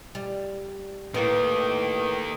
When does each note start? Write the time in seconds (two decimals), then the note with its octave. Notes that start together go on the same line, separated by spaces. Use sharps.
0.15 G3
1.14 A2 D#3 A#3 B4